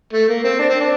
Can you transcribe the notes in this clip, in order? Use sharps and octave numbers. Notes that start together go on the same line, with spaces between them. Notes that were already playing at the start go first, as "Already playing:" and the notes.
A3
A#3
C4
D4
C4
D4